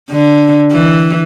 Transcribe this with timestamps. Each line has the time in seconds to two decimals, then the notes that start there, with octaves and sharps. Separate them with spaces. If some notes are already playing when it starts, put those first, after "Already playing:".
0.11 D3
0.72 E3